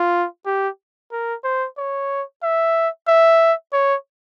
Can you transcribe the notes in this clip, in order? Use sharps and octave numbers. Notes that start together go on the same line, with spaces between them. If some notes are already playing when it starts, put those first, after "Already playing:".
Already playing: F4
G4
A#4
C5
C#5
E5
E5
C#5